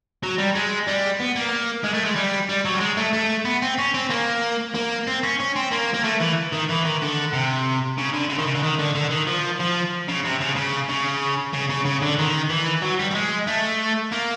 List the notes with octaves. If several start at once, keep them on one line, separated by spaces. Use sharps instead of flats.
F#3
G3
G#3
G3
B3
A#3
G#3
A3
G#3
G3
G3
F#3
G3
G#3
A3
A3
B3
C4
C#4
C4
A#3
A#3
C4
C#4
C#4
C4
A#3
A#3
A3
E3
D#3
E3
D#3
D3
C3
C#3
D3
C#3
D#3
C#3
D3
D#3
D3
D3
D#3
F3
F3
C#3
C3
C#3
C#3
C#3
C#3
C#3
C#3
D3
D#3
E3
F#3
G3
G3
G#3
A3
A#3